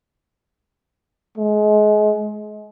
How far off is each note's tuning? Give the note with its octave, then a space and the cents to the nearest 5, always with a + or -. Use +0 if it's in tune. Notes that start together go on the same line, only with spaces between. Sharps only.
G#3 +30